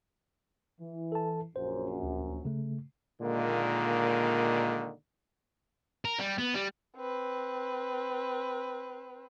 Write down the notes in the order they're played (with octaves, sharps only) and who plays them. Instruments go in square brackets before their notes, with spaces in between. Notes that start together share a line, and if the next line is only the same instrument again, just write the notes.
[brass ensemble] E3
[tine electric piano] A4 A5
[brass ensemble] A#1 F#2 [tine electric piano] C5
[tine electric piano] D2
C#3 A3
[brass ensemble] A#2 D3 D#3 G#3 A#3
[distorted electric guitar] A#4
G3
B3
G3
[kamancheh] C4 B4